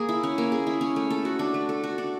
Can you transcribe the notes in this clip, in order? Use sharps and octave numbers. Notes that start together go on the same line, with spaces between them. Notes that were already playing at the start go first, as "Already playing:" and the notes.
Already playing: A#3 G#4
E4
C#4
A#3
G#4
E4
C#4
A3
A4
F#4
D4
A3
A4
F#4
D4